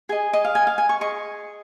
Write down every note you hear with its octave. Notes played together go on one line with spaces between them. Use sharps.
G#4 D#5 G#5
D#5
F5
G#5
F5
G#5
C#6
G#4 D#5 C#6